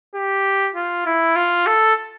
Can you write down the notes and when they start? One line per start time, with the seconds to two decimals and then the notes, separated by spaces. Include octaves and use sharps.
0.15 G4
0.75 F4
1.06 E4
1.36 F4
1.66 A4